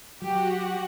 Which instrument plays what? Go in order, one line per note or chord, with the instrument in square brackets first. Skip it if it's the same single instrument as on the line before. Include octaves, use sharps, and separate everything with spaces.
[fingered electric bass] F#3 [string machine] F#4 F#5 [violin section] G4